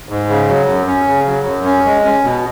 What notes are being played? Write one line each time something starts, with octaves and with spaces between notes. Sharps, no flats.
G#2
C#3
F#3
F#2
C#4
C#3
F#3
F#2
C#4
G#3
C#4
B2